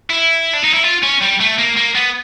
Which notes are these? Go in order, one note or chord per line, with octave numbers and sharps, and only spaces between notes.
E4
D4
D#4
E4
F4
C#4
G3
A3
A#3
A#3
B3